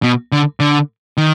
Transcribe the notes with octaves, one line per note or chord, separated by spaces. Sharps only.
B2
D3
D3
D#3